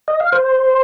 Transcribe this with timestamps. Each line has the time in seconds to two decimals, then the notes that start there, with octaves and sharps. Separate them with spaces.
0.08 D#5
0.20 F5
0.32 C5